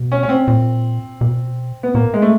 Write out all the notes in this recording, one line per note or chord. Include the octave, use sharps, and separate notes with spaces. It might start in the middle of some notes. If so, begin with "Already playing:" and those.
Already playing: B2
C#4
C#4
C4
A#2
B2
B3
A#2 A#3
G#3
A3